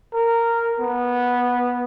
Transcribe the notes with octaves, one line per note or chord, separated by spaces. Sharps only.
A#4
B3